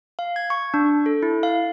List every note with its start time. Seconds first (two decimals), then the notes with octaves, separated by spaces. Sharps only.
0.19 F5
0.36 G#6
0.50 C#6
0.74 D4
1.06 A4
1.23 E4
1.43 F5